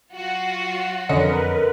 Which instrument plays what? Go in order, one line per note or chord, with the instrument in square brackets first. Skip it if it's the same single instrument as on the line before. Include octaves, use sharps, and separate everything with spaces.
[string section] F#3 F4 F#4
[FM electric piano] F2 C#4 [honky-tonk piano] D3 D#5 C#7 [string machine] A#4 B4